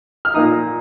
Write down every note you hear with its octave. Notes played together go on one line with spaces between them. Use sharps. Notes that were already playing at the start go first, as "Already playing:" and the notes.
F6
A#2 A#3 D#4 D#6